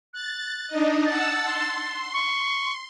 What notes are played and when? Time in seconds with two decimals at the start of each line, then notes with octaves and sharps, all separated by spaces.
0.13 F#6 A6
0.68 D4 D#4 D#5
1.06 F#5 A5 E6 A6
1.45 C6
2.13 C#6